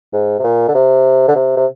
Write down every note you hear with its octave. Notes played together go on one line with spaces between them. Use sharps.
G#2
C3
A#2
D3
C3
D3
C3
C3